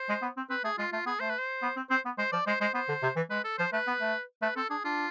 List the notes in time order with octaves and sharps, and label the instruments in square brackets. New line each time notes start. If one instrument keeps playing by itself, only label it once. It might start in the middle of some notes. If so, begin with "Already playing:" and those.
Already playing: [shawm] C5
[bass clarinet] G#3
B3
C4
[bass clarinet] C4 [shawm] B4
[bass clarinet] A3 [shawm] G#4
[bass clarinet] G#3 [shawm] F4
[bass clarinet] A3 [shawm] F4
[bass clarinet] B3 [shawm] G#4
[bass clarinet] A3 [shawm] C5
[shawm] B4
C5
[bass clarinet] B3
C4
[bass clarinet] C4 [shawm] C5
[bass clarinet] B3
[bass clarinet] G#3 [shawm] C5
[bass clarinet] F3 [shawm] D5
[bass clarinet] G#3 [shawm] C5
[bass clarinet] G#3 [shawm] C5
[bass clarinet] B3 [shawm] C5
[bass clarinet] D3
C3
E3
[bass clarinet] G#3 [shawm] B4
[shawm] A4
[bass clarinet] F3 [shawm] C5
[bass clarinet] A3 [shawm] B4
[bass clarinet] B3
A3
[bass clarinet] A3 [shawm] B4
[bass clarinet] C4 [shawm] A4
[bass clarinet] D4 [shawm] G#4
[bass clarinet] D4 [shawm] F4